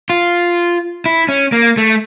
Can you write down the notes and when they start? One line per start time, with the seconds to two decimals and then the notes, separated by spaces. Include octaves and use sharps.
0.10 F4
1.06 E4
1.29 C#4
1.52 A#3
1.77 A3